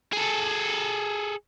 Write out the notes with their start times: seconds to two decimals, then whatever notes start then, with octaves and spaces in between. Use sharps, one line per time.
0.13 G#4 A4